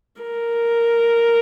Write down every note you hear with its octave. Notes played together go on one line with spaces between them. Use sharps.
A#4